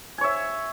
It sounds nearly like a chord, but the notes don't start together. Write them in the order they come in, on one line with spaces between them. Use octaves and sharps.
G#5 C#5 E5